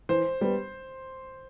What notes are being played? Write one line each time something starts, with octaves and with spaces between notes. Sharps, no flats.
E3 C5
G3 B3